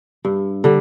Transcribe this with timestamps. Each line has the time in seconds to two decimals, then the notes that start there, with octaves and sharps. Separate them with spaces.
0.25 G2
0.64 D3 G3